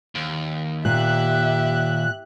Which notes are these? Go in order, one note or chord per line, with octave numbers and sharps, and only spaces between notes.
D#2
A#2 G4 E5 F#6